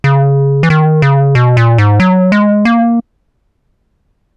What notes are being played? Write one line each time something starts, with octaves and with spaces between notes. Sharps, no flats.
C#3
E3
D#3
C#3
B2
A#2
G#2
F#3
G#3
A#3